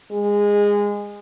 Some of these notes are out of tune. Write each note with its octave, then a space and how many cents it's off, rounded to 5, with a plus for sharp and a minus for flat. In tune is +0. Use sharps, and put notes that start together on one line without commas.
G#3 -20